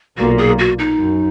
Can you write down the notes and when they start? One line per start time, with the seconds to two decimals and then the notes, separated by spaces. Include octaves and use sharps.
0.18 B1 A#2 A#3 F#4
0.38 G#4
0.59 F#4
0.79 D#4
0.99 F#2